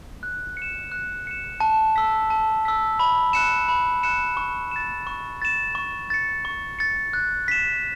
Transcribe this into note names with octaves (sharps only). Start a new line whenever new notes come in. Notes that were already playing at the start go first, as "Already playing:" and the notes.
F#6
C#7 E7
F#6
C#7 E7
A5
E6 B6
A5
E6 B6
B5
F#6 C#7 E7
B5
F#6 C#7 E7
C#6
A6 E7
C#6
A6 E7
C#6
A6 C#7
C#6
A6 C#7
F#6
B6 E7